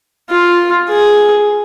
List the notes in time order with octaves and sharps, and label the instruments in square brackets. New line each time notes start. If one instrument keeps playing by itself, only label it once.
[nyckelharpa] F4
G#4